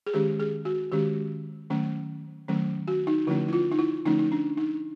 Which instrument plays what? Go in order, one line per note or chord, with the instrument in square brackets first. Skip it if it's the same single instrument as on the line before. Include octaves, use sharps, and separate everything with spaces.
[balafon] G#4
D#3 G#3 C#4 G4
G#4
F#4
D#3 G#3 C#4 G4
D#3 F#3 A3 C#4
D#3 F#3 A3 C#4
F#4
D#4
D3 F3 A3 C#4 E4
E4
F4
D#4
E4
D3 F3 A3 C#4 D#4
D#4
D4
D#4